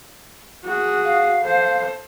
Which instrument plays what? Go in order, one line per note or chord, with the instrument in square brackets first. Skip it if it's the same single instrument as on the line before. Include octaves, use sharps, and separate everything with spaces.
[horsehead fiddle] F#4 G#4
[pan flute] F5
[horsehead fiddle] A4 C5